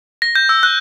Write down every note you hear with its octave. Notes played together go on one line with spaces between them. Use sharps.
A#6
G6
E6
F#6